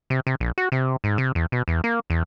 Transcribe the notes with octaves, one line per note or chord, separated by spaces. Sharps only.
C3
C3
A#1
F#4
C3
G#2
C3
E2
B2
E2
A#3
E2